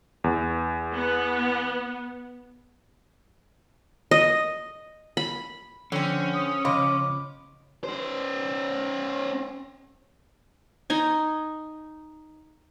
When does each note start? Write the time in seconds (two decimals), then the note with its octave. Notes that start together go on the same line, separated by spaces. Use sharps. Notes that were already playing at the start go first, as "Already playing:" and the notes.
0.24 E2
0.94 B3
4.11 D#5
5.17 B5
5.92 D3 F3 C4 C#4
6.35 D#6
6.65 C#3 F3 C#5 D#5 B5 D6
7.84 C#4 C5
10.90 D#4 G#5